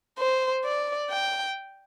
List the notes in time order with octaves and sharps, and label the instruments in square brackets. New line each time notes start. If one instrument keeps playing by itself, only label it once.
[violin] C5
D5
G5